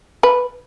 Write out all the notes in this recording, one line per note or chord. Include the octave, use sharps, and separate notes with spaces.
B4